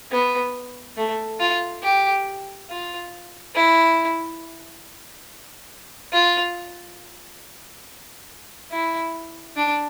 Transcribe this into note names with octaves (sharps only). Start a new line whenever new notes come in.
B3
A3
F4
G4
F4
E4
F4
E4
D4